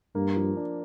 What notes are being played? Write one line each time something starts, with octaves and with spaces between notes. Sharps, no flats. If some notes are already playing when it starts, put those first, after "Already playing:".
G2 A#3
F3
D4